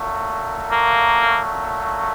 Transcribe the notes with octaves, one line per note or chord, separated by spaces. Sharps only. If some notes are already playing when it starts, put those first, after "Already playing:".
Already playing: A#2 F#3 A3
A#3